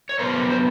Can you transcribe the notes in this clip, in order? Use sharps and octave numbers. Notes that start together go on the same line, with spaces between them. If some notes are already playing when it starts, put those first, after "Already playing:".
C#5
D3 F#3 B3 D4 A#4 C5
C5